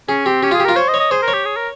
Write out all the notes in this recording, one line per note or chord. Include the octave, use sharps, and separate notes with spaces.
C#4 G#4
C4 G4
C#4 G4
F4 G#4
G4
F4 A#4
C5 C#5
D#5
C#5
D#5
G#4 C5
A#4
C#5
G4
G#4
A#4